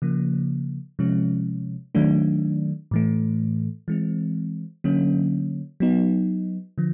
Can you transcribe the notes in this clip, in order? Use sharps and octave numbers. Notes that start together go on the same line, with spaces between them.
C#3 F3 A#3
C3 F3 G#3 C#4
D#3 F#3 A3 D4
A2 E3 A3
E3 G#3 C4
D3 F#3 A#3 C#4
F#3 B3 D#4
D3 F3